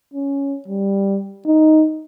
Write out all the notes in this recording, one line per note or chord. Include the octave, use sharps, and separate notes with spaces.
C#4
G3
D#4